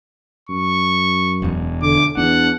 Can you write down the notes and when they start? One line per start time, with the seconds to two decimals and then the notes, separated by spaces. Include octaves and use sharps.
0.49 F#2 C#6
1.42 E1 E2
1.82 D3 D6
2.17 E2 D4 F#5